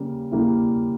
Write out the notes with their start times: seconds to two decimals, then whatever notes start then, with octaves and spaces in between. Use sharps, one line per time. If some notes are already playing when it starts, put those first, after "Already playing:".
Already playing: C#3 G3 A#3
0.31 C#3 G3 A#3 E4